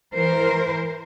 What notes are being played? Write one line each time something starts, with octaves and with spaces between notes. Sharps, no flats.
E3 A#4 C5